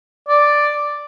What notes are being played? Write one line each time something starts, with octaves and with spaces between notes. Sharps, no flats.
D5